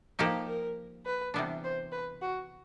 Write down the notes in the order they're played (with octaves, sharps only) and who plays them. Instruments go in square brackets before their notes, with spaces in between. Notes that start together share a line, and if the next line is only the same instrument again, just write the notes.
[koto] F3 A#3 D#4 G4 [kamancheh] F4
[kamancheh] A#4
B4
[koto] C3 E3 G3 B3 D4
[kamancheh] C5
B4
F#4